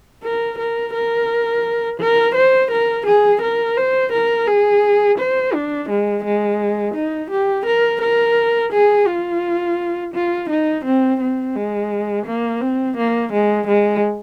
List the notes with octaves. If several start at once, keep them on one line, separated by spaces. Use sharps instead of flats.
A#4
A#4
A#4
A#4
C5
A#4
G#4
A#4
C5
A#4
G#4
C5
D4
G#3
G#3
D#4
G4
A#4
A#4
G#4
F4
F4
D#4
C4
C4
G#3
A#3
C4
A#3
G#3
G#3